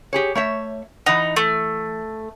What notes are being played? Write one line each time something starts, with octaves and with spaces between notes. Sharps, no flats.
G4 G#4 C#5
A3 C#5 E5
E3 D#4 F#5
A3